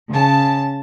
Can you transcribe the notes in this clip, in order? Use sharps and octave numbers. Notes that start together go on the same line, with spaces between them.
C#3 A5